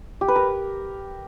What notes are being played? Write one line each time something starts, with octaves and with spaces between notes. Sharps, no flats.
G4
B4
A#4